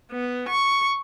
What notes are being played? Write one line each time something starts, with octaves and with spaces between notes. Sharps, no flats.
B3
C#6